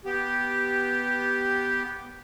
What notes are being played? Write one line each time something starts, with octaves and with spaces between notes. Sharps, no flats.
B3 G4